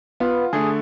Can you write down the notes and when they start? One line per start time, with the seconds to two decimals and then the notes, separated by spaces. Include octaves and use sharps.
0.20 B3 F4
0.53 D3 A3 G#4